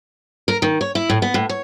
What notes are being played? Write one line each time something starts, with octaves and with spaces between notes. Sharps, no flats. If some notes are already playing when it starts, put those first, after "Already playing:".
A#4
D#3
C#5
E4
A2
B3
A2
C#5